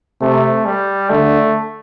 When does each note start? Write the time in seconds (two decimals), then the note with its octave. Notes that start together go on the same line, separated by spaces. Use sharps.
0.21 C3 A3
0.66 G3
1.10 D3 A3